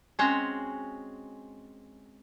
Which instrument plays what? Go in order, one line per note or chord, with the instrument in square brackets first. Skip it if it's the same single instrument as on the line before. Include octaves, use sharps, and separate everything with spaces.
[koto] G#3 C4 C#4 F#4 C#5